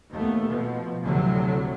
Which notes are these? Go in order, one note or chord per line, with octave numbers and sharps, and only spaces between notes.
D#2 A3 B3
B2 F3
D2 A2 C3 F#3